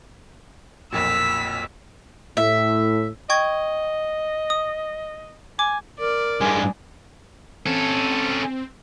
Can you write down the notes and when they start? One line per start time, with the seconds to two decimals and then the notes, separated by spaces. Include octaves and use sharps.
0.92 B1 F2 A#2 E6 B6
2.37 A2 E5
3.30 D#5 G5 C#6 G#6
4.50 D#6
5.59 G#5 D6
6.00 A#4 D5
6.41 G2 G#3 G#5
7.66 C4 C#4 A4